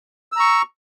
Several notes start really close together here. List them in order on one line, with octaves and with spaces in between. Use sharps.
E6 A#5 C#6